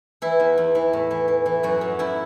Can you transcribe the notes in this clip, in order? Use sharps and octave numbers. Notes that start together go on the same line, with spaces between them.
E3 E4
E2
E2
E3
A2
E3
E3
E3
F#2 F#4
F#2
F#2 E4